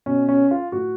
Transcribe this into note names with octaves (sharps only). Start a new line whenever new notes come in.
B2 C#4
C#4
F4
A2 F#4